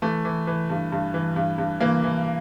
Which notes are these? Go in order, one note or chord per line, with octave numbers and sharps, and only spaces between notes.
E3 A3
E3
E3
G2
G2
E3
G2
G2
E3 A#3
E3